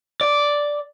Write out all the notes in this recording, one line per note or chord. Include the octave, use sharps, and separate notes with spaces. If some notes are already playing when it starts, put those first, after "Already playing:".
D5